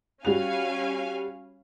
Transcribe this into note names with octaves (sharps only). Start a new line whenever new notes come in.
G3 C#4 F#4 F5 G#5 F7